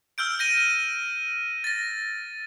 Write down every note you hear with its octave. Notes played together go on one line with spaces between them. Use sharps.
E6 F6 G6 D7
G6 A#6 D#7
A6 A#6